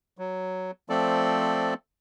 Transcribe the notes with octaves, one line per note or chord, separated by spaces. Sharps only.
F#3
F3 A3 C4 A4 D5